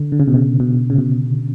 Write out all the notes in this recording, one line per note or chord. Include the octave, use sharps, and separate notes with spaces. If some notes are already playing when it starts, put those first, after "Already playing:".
Already playing: D3
D3
C#3
B2
C#3
B2
C#3
B2